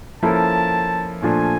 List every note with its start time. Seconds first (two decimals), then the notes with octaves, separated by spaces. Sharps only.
0.22 F3 A#3 C#4 E4 A4 A5
1.22 A#2 F3 A3 D4 F4 G#5